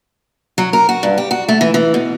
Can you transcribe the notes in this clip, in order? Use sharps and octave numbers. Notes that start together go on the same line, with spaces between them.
F#3
A#4
F#4
G2
G4
F#4
A3
E3
E3
B2